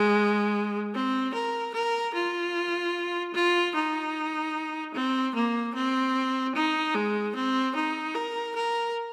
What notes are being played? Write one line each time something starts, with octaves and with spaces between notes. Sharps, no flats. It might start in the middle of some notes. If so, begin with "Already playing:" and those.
Already playing: G#3
C4
A#4
A#4
F4
F4
D#4
C4
A#3
C4
D#4
G#3
C4
D#4
A#4
A#4